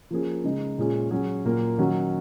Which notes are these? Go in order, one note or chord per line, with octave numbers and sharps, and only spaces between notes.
F3 A#3 C#4 G#4
C#3 G#3 D#4
A#2 G#3 C#4 F4 G#4
F#3 C#4 G#4
A#2 F#3 A#3
D#3 F#3 C#4 F#4